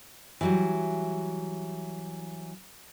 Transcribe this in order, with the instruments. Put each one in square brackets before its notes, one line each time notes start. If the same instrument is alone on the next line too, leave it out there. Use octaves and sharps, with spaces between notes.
[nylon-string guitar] E3 F#3 G3